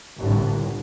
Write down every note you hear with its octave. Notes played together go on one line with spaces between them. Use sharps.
G1 C2 A2 D3